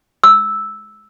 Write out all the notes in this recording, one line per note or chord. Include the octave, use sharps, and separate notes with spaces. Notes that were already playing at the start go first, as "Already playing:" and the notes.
E6